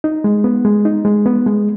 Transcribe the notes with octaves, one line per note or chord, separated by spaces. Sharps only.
D#4
G#3
B3
G#3
D#4
G#3
B3
G#3